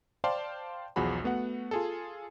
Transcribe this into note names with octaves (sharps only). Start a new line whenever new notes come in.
C5 D5 F5 G5 A5 C6
B1 E2 F3 F#4 G#4 B5
A3 B3 F#4 F#5
F4 G#4 A4